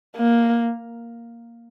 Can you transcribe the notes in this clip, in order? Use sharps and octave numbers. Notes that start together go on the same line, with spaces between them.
A#3